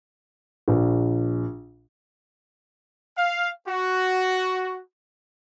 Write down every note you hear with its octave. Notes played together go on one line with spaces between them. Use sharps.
A#1
F5
F#4